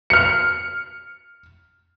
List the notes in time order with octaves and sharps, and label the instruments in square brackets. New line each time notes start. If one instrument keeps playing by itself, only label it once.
[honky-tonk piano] F6 C#7